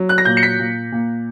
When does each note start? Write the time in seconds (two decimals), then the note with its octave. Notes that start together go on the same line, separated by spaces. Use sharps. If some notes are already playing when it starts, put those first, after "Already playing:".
Already playing: F#3
0.09 F#6
0.18 A#6
0.25 A#2 G6
0.37 C#7
0.43 B6
0.59 A#2
0.92 A#2